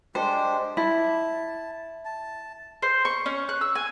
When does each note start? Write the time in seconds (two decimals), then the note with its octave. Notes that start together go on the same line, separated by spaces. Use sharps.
0.15 G#3 D4 G4 C5
0.77 E4 A5
2.05 A5
2.82 C5
3.05 C#6
3.26 C#4
3.49 F#6
3.61 E6
3.75 G#5